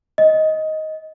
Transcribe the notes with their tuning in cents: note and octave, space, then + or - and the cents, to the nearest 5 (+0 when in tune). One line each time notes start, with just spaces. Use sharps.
D#5 +10